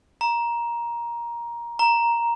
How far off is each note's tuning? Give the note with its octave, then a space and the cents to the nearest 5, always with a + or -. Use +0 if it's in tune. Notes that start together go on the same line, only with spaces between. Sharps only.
A#5 +15
A#5 +5